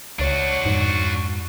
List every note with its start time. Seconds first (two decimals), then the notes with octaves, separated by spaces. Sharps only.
0.19 C#2 D4 F#4 C#5
0.66 F2 G#2